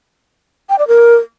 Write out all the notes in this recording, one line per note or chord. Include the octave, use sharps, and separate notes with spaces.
G5
D5
A#4